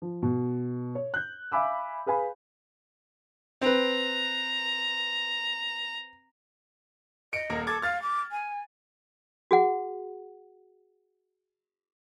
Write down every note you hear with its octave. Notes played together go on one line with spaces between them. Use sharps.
F3
B2
C#5
F#6 G6
E5 F5 G#5 B5 D6 E6
G#4 B4 F5 G#5 B5
C4 B4 A#5
D#5 C#7 D7
D#1 A#3 A#4
A4 D6 G#6 A6
F5 F6 A6
D6
G#5
F#4 G#4 F#5